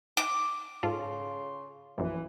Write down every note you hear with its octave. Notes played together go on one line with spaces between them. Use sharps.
D6
G#2 C#3 F4 A4 C6
A#1 F#2 E3